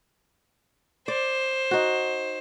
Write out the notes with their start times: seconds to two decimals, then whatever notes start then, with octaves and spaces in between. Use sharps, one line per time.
1.08 C5 D5
1.71 D#4 F#4